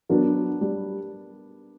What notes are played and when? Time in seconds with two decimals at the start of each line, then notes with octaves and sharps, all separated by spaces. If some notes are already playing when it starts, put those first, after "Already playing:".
0.09 F#3 B3 D4 A#4
0.61 G3